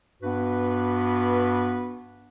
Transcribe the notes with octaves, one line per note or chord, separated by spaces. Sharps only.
G2 B3 F#4 B4